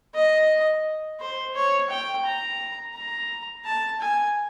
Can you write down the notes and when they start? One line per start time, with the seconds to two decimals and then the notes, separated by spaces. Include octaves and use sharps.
0.14 D#5
1.20 C5
1.55 C#5
1.90 G5
2.25 A#5
2.95 A#5
3.65 A5
4.00 G#5